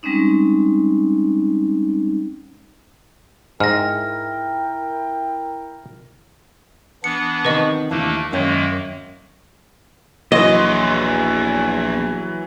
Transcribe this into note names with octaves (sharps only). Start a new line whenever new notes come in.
G3 G#3 C4 C#4 D#4
G#2 E4 A#4 G5 F6 A#6
E3 B3 D4 C#7
C3 D#3 B4 D#5 C#6
D#2 E3 A3 A#3 D4
F#2 D#3 G#3 A#3 C#4 G5
A#1 E2 E3 F#3 D#5 C6